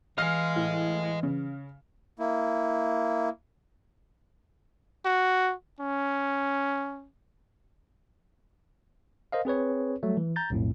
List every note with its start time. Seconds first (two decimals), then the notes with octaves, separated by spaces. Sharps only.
0.18 E3 D#5 F5 G#5 F6 C7
0.56 A2
1.23 C#3
2.19 A#3 E4
5.05 F#4
5.80 C#4
9.32 A#4 C5 D#5 F5
9.45 C4 G#4 B4 C#5
10.03 F#3 G3 A3
10.17 E3
10.36 A#5 G6 A6
10.50 B1 F2 A2